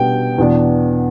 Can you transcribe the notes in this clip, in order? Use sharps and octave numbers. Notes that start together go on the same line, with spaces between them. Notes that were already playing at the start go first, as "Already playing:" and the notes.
Already playing: B2 G3 B3 D4 G5
E2 B2 B3 D4